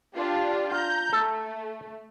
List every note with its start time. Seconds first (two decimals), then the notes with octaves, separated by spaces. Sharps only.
0.14 D4 F4 G4
0.71 F4 A#5 G6
1.13 A3 A4